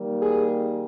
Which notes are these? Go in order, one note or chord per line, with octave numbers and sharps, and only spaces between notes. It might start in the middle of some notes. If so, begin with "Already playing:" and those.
Already playing: D#3 G3 A#3
G#4